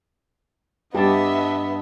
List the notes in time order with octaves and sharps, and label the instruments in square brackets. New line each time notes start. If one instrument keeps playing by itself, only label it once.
[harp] G2 D4 [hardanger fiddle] B3 [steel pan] G4 [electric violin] D#5 E5